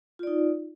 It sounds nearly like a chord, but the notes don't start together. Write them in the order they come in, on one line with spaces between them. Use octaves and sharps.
F4 D5 D#4